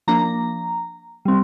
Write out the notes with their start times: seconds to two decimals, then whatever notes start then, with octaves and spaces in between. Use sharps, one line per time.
0.07 F3 A#3 D4 A#5
1.25 G3 C4